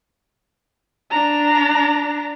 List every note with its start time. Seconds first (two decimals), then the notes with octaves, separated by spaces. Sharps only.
1.11 D4 A#5